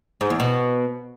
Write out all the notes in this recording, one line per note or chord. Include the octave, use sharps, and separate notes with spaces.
G#2
E2
B2